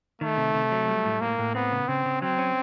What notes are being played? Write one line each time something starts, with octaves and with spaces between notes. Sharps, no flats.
D#3 A3
C3
C3
F#3
G3
A2
A2 A#3
A2
B3 C4
C#3
C#3 C4
C#3
F#3 C4
C#4